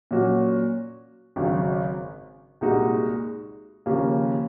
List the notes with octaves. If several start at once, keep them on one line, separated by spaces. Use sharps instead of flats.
A#2 F#3 C#4 F#4
G#1 F#2 C#3 F#3
C2 A#2 G#3 D#4 F#4
D#2 C#3 F3 A#3